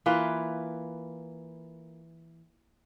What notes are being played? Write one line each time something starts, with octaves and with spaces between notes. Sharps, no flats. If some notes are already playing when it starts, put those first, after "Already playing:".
E3 A#3 F4 B4